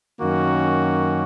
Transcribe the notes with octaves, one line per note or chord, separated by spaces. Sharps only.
F#2 D#3 A#3 C#4 F#4